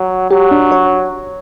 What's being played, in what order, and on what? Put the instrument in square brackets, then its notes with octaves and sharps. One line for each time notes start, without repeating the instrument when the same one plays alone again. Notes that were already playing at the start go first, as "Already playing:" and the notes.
Already playing: [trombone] F#3
[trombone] F#3 [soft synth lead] G4
[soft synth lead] D4
C#5